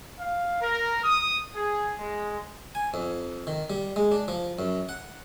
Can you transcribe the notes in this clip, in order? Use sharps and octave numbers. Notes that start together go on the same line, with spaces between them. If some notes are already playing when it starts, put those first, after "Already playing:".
F5
A#4
D#6
G#4
G#3
G#5
F2
D#3
G3
G#3
D4
F3
F#2
F#5